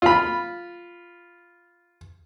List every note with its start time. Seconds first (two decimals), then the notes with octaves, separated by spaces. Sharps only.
0.02 F4 B5